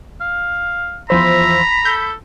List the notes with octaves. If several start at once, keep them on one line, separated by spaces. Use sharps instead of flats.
F5
E2 F3 C5 E5 A#5 B5
A4 G6